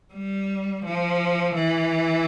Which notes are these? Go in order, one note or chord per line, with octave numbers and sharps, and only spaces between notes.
G3
F3
E3